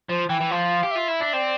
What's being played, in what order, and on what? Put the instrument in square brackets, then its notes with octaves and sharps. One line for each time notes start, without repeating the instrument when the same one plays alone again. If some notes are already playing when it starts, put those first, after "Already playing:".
[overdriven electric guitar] F3 [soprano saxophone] C5
[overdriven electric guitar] E3 [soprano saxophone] G5
[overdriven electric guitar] E3
[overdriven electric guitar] F3 [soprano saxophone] F5
[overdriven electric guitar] G4
[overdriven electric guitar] F4 [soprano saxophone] E5
[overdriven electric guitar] E4
D4
[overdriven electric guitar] C4 [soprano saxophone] D5